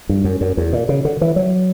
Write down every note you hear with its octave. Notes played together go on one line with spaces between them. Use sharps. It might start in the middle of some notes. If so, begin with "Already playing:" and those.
G2
F#2
F#2
E2
A#2
C#3
D3
E3
F#3